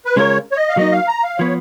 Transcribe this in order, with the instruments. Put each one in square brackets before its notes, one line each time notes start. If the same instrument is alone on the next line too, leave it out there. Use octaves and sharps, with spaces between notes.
[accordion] B4
[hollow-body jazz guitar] C#3 G#3 C#4 F4 A#4 [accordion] C#5
[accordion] C#5
D#5
F5
[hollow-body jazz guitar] F#3 A#3 D#4 [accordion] D#5
[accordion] F5
A#5
F5
[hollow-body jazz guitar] F3 B3 [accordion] C#5